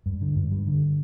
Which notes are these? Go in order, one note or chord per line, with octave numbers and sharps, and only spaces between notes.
G2
D3
G2
G3
D3